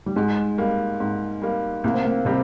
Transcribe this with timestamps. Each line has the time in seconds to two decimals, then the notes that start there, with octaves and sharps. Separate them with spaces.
0.06 G3
0.16 G#2 G#3
0.58 G3 A#3
1.00 G#2
1.42 G3 A#3
1.84 C2 A#3
1.94 C4
2.05 A#3
2.25 C3 G3 C4 G4